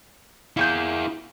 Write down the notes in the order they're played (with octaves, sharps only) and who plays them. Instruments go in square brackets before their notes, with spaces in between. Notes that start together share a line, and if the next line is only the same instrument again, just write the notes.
[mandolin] A#3 C#6 G6 [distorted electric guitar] E4 G#4